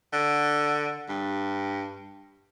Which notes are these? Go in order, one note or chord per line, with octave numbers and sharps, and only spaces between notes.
D3
G2